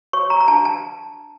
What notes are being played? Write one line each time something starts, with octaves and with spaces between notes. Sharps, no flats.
C#5 C#6
A#5
A#5
D4 A5
A5